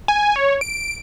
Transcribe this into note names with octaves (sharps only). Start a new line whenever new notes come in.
G#5
C#5
D7